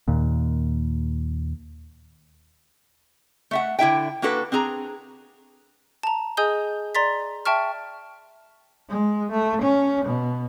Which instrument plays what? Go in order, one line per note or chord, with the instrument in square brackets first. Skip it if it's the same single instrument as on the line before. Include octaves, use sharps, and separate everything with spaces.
[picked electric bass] D#2 A#2
[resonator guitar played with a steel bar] A3 E5 F#5
D3 E4 E5 G5
A#3 D4 F#4 A4 B4
C4 D4 G#4 A#5
[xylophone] A5 A#5
G#4 D#5 G#5 D#6 G6 G7
D5 A#5 C6 A6 B6
E5 G5 A5 C#6 F6
[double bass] G#3
A3
C#4
B2